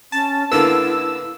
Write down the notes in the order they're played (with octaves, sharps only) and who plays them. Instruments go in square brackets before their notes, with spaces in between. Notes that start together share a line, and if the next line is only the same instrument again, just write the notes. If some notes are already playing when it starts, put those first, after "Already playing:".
[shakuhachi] C#4 [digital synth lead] A5
[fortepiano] D3 A#3 B3 [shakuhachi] E4 [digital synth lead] E6